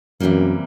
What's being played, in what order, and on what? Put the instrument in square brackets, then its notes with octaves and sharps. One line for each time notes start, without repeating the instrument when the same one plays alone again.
[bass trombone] F#2 [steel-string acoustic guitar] C3 E3 G3 A#3